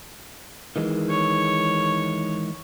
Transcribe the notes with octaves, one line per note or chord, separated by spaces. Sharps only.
D#3 E3 G#3
C#5